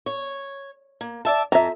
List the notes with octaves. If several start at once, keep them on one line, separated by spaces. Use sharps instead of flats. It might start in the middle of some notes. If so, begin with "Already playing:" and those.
C#5
A#3
D5 E5 A5
F2 E5 A#5